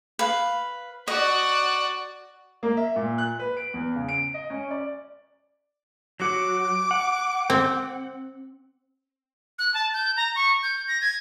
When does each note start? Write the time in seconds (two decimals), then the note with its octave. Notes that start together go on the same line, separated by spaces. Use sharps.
0.19 B4 F5
1.08 F#4 D5 D#5
2.63 A#3
2.77 E5
2.96 A#2
3.18 F#6
3.39 B4
3.57 D7
3.74 E2
3.95 C#3
4.09 D7
4.34 D#5
4.50 C#4
4.71 D5
6.20 F#3 F#4 D6
6.91 F#5
7.50 C4
9.59 F#6
9.74 A5
9.93 G6
10.17 A#5
10.35 C#6
10.63 G6
10.88 A#6
11.01 G#6